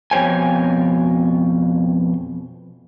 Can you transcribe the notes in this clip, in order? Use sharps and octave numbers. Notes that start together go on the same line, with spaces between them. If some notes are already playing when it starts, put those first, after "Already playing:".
F2 B2 C5 C#5 G5 G#5